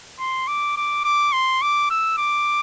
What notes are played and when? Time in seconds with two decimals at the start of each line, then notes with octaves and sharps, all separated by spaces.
0.19 C6
0.47 D6
0.77 D6
1.04 D6
1.32 C6
1.62 D6
1.90 E6
2.18 D6